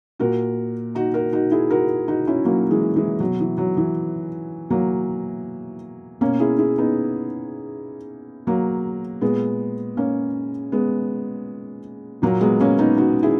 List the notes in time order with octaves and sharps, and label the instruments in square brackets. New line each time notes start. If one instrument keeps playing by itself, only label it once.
[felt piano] A#2 F#4 A#4
D#4 F#4
F#4 A#4
D#4 F#4
E4 G#4
F#4 A#4
D#4 F#4
C#4 E4
F#3 A#3
E3 G#3
E3 G#3
B2 F#3
E3
F#3
E3
F#3 A#3
B2 A#3 C#4
E4 G#4
E4 G#4
B3 D#4
F#3 A#3
A#2 G#3 B3
A#3 C#4
G#3 B3
A#2 F#3 A#3
G#3 B3
A#3 C#4
B3 D#4
D#4 F#4
E4 G#4